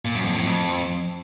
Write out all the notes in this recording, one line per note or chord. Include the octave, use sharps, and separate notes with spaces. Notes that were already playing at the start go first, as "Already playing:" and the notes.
A#2
F#2
F2
A2
F2